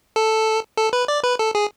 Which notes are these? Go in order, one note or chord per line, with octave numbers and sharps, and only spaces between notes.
A4
A4
B4
D5
B4
A4
G#4